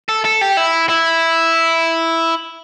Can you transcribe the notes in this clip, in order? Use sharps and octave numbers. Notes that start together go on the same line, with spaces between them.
A4
A4
G4
E4
E4